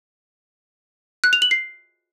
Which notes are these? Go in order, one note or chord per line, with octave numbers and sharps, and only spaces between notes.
F#6
F7
F#7
C7